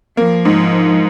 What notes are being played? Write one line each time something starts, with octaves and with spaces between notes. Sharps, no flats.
F3 A#3
G#2